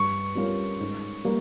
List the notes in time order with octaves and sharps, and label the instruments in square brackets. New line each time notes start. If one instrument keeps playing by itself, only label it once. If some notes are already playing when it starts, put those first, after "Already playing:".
Already playing: [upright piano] G2 [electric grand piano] C#6
[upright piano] G3 C#4 F4 A#4
G#2
G3 A#3